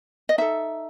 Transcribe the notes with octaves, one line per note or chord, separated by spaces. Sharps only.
D#5
D#4 A4 E5